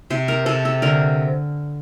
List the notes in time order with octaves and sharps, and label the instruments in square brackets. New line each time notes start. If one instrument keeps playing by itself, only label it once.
[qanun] C3 C5
A#4
C3 A4
A4
D3 A#4